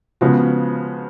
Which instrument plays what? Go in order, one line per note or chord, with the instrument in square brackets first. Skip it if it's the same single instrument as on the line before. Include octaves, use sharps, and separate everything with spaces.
[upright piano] C#3 F3 G#3 B3 F#4